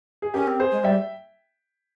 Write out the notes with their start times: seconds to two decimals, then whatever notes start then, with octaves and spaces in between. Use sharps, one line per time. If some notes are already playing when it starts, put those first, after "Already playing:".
0.22 G#4
0.34 C#4 G4 A#4
0.47 C4
0.60 G#4 C5
0.72 G#3
0.84 G3 E5 G5